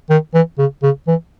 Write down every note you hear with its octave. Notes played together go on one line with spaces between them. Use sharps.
D#3
E3
C#3
C#3
E3